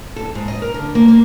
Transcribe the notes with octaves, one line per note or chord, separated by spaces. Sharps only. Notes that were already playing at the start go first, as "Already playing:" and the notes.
A4
G#2
D#5
A#4
D3
A#3
A#3